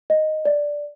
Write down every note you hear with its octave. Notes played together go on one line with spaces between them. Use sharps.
D#5
D5